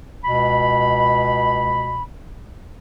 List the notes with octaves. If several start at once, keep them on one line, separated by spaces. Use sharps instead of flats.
C#2 B2 B5